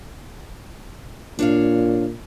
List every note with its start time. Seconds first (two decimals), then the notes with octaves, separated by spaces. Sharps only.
1.39 A#2 D4 C#5 F5